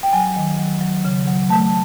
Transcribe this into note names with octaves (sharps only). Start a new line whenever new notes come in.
G5
F#3 G#5
D#3
F#3
F#3
C#3
F#3
A3 A5